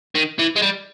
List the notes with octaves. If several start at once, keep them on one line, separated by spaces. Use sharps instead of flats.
D#3
E3
G#3
G3